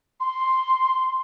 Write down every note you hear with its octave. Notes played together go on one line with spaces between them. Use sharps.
C6